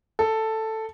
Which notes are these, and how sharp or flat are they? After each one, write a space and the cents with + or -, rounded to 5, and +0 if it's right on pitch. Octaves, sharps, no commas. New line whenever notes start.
A4 +5